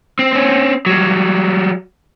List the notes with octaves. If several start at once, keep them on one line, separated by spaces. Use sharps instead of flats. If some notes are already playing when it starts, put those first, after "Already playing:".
C4
C4 C#4
F#3 G3